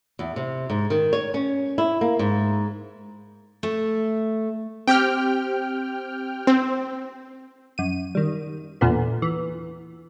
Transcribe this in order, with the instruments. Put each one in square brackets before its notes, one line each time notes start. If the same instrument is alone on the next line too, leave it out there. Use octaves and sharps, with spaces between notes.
[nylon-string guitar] E2
C3
G#2
D#3
C#5
C#4
E4
A#3
G#2
[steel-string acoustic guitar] A3
[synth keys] C4 G4 [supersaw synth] G5 F6
[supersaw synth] C4
[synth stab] F#2 D#7
D#3 G3
E2 A#2 D3 B3
E3